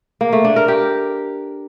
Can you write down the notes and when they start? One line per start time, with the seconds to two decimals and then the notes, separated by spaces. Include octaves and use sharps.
0.21 A#3
0.33 A3
0.44 D4
0.56 A#4
0.68 G4